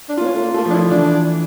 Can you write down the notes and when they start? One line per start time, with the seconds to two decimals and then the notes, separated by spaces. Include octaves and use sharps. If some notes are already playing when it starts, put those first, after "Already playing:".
0.09 D4
0.17 F4
0.21 A#3
0.25 C#4
0.35 A3
0.41 A#3
0.54 A3
0.57 A#3
0.65 F3
0.70 D4
0.74 E4
0.78 F3
0.90 E3 D4